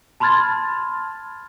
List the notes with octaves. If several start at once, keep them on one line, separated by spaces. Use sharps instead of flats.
A5 B5 C6 F6 G#6 A6